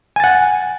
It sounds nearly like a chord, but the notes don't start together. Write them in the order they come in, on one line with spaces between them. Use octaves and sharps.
G#5 A6 F#5